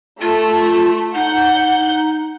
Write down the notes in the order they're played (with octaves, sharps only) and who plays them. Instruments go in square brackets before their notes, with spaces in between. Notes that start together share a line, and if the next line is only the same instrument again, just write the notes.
[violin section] A3 [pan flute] F4
[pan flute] D#4 [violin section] F#5 G6